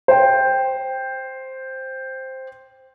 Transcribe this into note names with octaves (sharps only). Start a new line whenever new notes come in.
C5 G5